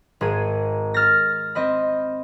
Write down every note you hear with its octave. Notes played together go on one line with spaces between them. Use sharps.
G#1 G#4 D#7
E6 F6 A6 A#6
C4 D#5 B5